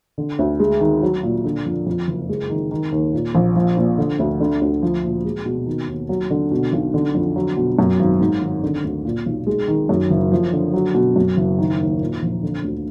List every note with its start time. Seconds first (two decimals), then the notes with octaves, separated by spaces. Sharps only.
0.18 D3
0.39 D2
0.60 G#3
0.81 D#3
1.02 F#3
1.23 A#2
1.45 D3
1.66 F2
1.87 F2
2.08 F#1
2.29 G#3
2.50 D#3
2.71 D#3
2.92 D#2
3.13 A#2
3.35 A#1
3.56 F3
3.77 A#2
3.98 D3
4.19 D2
4.40 D3
4.61 D2
4.82 F3
5.04 A#2
5.24 G#3
5.46 B2
5.66 D#3
5.88 D#2
6.09 F#3
6.30 D3
6.51 B2
6.73 B1
6.94 D3
7.15 F2
7.36 F#3
7.57 B2
7.79 F#2
7.99 G#1
8.21 G#2
8.42 G#1
8.63 D3
8.84 D2
9.05 A#2
9.26 B1
9.47 G#3
9.68 D#3
9.89 F#2
10.10 F#1
10.32 F3
10.53 D3
10.74 F#3
10.94 B2
11.16 F#2
11.37 F#1
11.59 D#3
11.80 D#2
12.01 A#2
12.22 A#1
12.43 D3
12.64 D2